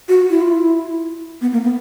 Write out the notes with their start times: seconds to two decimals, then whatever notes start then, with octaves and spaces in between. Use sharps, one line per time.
0.09 F#4
0.30 E4
0.42 F4
0.52 E4
1.41 B3
1.52 A#3
1.64 B3